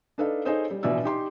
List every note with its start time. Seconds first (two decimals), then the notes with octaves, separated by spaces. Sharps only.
0.18 D4 D#4 A4 B4 D#5 F5
0.45 D#4 G#4 A4 C5 C#5 D#5
0.71 G3
0.83 A#1 B2 E3 D5 E5 E6
1.04 D#4 G4 C6